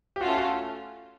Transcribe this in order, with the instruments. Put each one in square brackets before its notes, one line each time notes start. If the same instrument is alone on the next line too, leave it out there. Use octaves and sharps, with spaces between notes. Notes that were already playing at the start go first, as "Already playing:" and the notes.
[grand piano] G4
[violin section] A3 C#4 F4 [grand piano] F#4
[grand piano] F#4